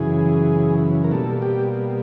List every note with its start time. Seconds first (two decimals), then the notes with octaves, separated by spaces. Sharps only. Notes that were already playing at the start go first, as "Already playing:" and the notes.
Already playing: F#2 C#3 E3 G#4
1.04 A#4
1.11 B2 G3 A#3 A4
1.42 G4